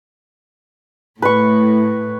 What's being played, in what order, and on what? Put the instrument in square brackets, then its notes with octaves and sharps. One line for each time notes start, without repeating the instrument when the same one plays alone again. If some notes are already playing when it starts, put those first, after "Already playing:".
[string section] A2 [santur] B4 C#6